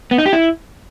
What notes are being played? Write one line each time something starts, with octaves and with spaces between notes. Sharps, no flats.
B3
D#4
G4
E4